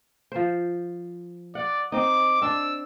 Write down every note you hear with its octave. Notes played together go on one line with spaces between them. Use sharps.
F3 C5
D5 F#5
C4 D#4 D6
C4 D4 D5 E6